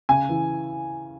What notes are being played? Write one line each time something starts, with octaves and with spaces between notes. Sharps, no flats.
C#3 G#5
E3